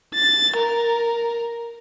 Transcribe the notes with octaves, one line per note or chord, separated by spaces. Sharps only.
A6
A#4